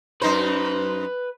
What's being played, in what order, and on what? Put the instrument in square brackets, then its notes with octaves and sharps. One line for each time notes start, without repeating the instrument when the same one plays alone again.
[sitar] F#2 D#4 C5 [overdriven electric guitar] B4